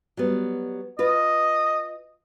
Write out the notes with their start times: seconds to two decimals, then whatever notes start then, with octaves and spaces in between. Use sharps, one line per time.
0.17 F#3 G3 B3
0.99 F4 B4 D#5